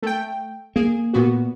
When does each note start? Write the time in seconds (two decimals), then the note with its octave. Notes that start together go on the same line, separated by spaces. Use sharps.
0.02 A3 G5
0.76 A#3 G#4
1.13 A#2 B3 F#4